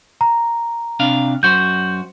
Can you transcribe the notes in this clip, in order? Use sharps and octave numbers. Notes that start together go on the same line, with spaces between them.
A#5
C3 D4 F5
F#2 F#4 C5 G6